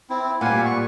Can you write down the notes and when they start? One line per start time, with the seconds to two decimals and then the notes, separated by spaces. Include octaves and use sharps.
0.10 C4 E4
0.41 A#2 G3 F5 F#5 G#5
0.65 C#6